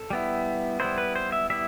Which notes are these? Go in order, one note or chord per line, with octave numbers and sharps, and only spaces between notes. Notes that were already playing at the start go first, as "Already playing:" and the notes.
Already playing: A4
G3 B3 E4
G3 B3 E4 C5
B4
C5
E5
G3 B3 E4 E5